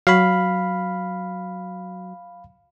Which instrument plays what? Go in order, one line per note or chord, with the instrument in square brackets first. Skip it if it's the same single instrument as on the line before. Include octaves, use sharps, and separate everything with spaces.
[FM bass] F#3 [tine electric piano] F5 B5